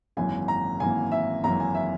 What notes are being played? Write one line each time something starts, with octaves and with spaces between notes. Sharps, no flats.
G#1 F#2 E3 A#3 G#5
A#5
G#1 F#2 E3 A#3 G#5
E5
G#1 F#2 E3 A#3 A#5
G#5
E5